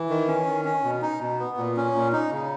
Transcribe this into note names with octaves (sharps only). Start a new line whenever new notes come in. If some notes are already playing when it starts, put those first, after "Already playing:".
Already playing: E3
D#3
C#4
D#3
C#4
B2
D#4
B2
B3
A#2
C#4
A#2
D#4
C#3